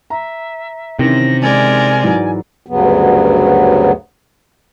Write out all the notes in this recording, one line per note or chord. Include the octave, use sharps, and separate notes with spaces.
E5 A#5
C3 D#3 E3 C#4 A#6
G#3 A#4 D5 G#5
G#2 E3 F#3
D2 G2 C#3 F#3 B3